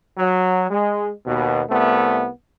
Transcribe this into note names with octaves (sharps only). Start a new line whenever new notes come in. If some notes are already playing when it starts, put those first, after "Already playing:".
F#3
G#3
D#2 B2
C2 A3 B3